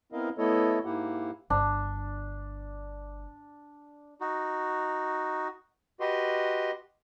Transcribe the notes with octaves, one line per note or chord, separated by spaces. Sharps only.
B3 C4 E4 A#4 D#5 F5
A3 B3 E4 A4 C#5 D#5
G#2 A#3 E4 G4 F#5
G1 D4
D#4 F#4
F#4 G4 B4 D#5 C6